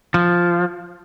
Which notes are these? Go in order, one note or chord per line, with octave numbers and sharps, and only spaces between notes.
F3